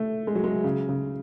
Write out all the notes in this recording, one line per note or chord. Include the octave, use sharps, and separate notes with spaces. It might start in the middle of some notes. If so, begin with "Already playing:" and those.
Already playing: A3
G#3
F#3
G#3
C#3
C#3